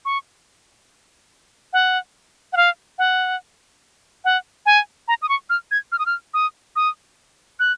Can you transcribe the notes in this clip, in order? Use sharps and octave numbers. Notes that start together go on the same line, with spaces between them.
C#6
F#5
F#5
F5
F#5
F#5
G#5
A#5
D#6
C#6
F6
G#6
F6
D#6
F6
D#6
D#6
F#6